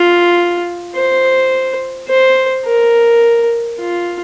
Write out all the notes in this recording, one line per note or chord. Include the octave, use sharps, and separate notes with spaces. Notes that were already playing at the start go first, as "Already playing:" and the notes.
Already playing: F4
C5
C5
A#4
F4